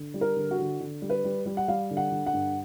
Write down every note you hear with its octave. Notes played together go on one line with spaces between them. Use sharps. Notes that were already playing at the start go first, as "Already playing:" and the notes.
Already playing: D3
G3
A#4
D3
F#4
D3
D3
G3
B4
G3
G3
F#5
G3 F5
D3
F#5
D3
F#5
G2